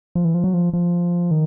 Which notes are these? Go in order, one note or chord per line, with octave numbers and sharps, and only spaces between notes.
F3
E3
F3
F#3
F3
F3
D#3